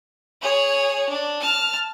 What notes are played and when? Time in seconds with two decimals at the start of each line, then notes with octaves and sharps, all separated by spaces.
0.41 G#4 C#5
1.09 D4
1.41 A5 F6